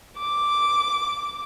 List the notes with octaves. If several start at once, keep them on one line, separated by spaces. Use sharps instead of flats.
D6